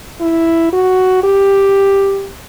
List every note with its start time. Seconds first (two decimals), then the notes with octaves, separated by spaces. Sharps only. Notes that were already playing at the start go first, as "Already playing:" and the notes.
0.21 E4
0.73 F#4
1.24 G4